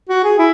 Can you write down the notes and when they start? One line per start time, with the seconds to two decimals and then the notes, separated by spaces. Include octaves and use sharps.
0.09 F#4
0.24 G#4
0.38 E4